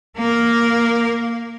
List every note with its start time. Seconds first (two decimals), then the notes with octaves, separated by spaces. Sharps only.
0.17 A#3 A#4